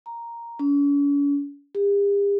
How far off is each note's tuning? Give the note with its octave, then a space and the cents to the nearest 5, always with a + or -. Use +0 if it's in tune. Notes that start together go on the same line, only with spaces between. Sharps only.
A#5 +0
C#4 +45
G4 +45